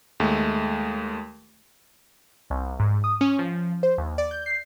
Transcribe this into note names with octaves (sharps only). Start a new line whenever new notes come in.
D#2 G#3 A3
C2
G#2
D#6
C#4
F3
C5
D#2
D5
G6
C7